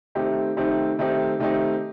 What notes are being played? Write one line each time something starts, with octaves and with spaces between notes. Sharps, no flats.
D#3 A3 C4 D#4 G4
D#3 A3 C4 D#4 G4
D#3 A3 C4 D#4 G4
D#3 A3 C4 D#4 G4